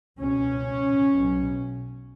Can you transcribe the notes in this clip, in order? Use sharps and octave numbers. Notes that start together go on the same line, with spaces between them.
C#2 B2 C#4
B1 B2